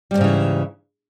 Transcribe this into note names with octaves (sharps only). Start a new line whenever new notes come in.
E2 G#2 C#3 E3 G3